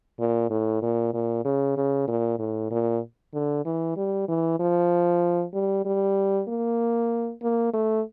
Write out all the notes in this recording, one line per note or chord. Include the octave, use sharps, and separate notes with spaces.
A#2
A2
A#2
A#2
C#3
C#3
A#2
A2
A#2
D3
E3
G3
E3
F3
G3
G3
A#3
A#3
A3